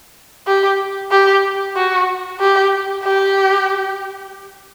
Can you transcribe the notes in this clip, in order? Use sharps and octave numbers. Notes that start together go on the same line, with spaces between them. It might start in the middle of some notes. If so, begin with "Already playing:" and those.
G4
G4
F#4
G4
G4